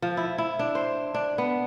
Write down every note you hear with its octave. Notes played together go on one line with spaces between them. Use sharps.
F3
E4
E4
D4
C5
D4
B3